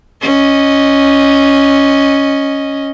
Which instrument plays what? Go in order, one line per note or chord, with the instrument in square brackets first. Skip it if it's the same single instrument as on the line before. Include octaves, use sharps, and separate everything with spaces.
[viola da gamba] C#4 D#5